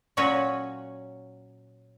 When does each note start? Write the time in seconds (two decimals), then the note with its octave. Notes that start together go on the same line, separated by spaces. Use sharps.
0.17 A#2 F#3 C#4 F#4 C#5 G#5